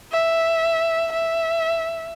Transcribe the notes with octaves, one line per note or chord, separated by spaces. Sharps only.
E5
E5